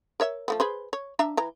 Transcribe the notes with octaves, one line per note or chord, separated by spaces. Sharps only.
A#4 C#5 E5
F3 A3 B3
G#4 B4 C5
C#5
D4 E5 A#5
E3 A#5